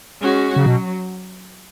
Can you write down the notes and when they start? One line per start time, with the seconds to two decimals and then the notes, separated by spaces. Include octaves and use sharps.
0.22 G#3 C#4 F#4
0.56 C#3 F#3
0.66 B2